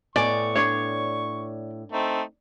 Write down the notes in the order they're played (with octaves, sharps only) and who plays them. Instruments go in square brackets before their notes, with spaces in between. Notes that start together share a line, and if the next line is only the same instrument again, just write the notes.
[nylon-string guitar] A2 B3 G#5 [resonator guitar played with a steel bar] D5 [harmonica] C#6
[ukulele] D4 C#5
[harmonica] A3 C4 D#4